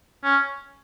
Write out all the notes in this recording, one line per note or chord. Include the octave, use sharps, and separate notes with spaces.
C#4